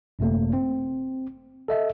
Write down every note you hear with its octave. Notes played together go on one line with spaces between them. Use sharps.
G1 F#2 C3 A3 A#3
C4
A4 D#5 E5